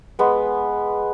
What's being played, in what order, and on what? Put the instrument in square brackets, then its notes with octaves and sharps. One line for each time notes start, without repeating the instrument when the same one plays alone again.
[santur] G#3 B3